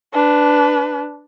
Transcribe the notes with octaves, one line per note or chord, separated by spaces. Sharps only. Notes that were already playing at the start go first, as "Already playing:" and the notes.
D4 B4